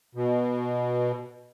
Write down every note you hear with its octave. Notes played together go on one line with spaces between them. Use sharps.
B2